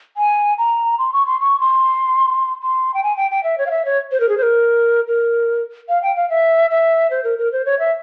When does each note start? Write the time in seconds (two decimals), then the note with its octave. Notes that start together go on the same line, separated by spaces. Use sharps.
0.17 G#5
0.58 A#5
0.99 C6
1.13 C#6
1.27 C6
1.40 C#6
1.60 C6
2.63 C6
2.94 G5
3.03 G#5
3.17 G5
3.31 G5
3.43 E5
3.58 C#5
3.66 F5
3.71 E5
3.85 C#5
4.12 C5
4.20 A#4
4.29 G#4
4.37 C5
4.42 A#4
5.07 A#4
5.89 F5
6.03 G5
6.16 F5
6.30 E5
6.70 E5
7.11 C5
7.24 A#4
7.39 A#4
7.52 C5
7.65 C#5
7.79 E5